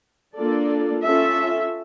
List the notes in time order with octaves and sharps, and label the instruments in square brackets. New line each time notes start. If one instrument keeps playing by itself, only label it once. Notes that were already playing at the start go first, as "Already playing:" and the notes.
[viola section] A#3 D4 F4 A4 D5
C#4 F4 A4 E5